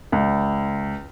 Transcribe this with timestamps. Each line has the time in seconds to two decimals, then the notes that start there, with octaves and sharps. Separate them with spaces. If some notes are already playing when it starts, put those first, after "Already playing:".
0.12 C#2